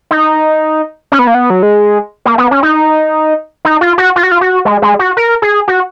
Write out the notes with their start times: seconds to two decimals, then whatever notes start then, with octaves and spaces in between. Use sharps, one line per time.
0.11 D#4
1.12 C#4
1.19 B3
1.27 A#3
1.35 B3
1.50 F#3
1.63 G#3
2.26 A#3
2.38 B3
2.51 C#4
2.63 D#4
3.65 D#4
3.81 F4
3.98 F#4
4.16 F4
4.23 F#4
4.31 F4
4.41 F#4
4.65 G#3
4.82 G#3
4.99 F#4
5.17 A#4
5.42 G#4
5.68 F#4